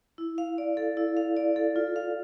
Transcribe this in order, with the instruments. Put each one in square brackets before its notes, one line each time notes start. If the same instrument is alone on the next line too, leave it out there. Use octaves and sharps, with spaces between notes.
[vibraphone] E4
F5
D5
A4
E4
F5
D5
A4
F4
F5